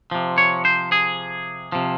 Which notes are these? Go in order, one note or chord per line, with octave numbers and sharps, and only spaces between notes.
C3 F3
C#5
C5
G#4
C3 F3